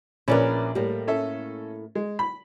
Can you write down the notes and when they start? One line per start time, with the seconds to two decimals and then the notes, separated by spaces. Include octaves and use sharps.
0.28 A#1 C#4 E4 A#4 B4 D5
0.75 A2 G3 A#3
1.08 C#4 A4 E5
1.95 G#3
2.19 B5